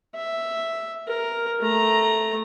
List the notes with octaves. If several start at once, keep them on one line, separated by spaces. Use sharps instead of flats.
E5
A#4
A3 A#5